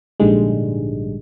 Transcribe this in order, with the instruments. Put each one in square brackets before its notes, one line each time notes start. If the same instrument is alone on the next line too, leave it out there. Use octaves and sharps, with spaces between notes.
[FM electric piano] A#1 G#2 D3 G3 G#3